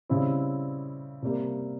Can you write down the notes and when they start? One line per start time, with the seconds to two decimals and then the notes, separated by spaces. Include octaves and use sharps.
0.09 C#3 G3 C4 E4
1.22 C3 G3 A#3